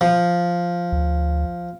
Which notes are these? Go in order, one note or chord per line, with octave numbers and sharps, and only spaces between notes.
F3
D2